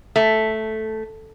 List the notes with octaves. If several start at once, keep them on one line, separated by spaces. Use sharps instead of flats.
A3